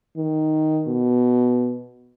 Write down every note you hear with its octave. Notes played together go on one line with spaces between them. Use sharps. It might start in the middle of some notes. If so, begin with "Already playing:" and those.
D#3
B2